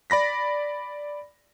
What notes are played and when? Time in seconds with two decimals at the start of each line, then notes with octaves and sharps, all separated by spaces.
0.10 D5 B5 A#6 B6